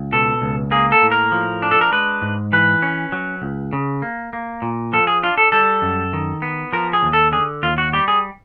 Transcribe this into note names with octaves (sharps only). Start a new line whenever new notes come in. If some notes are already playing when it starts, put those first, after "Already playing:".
Already playing: C#2
B2 A4
C#2
A#3 G#4
A4
A2
A#4
F3
D4
A4
A#4
G#3 B4
G#2
E3 B4
C#4
F#3
C#2
C#3
A#3
A#3
A#2
F3 A4
G#4
D4 F4
A4
G3 A4
F#2
D#3
B3
F3 A#4
G#4
D#2
A4
D3 G#4
D#2 F4
F#4
G3 G4
G#4